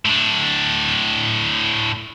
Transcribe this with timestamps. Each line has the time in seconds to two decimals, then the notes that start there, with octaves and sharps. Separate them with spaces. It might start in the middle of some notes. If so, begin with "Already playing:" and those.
0.06 A2 D4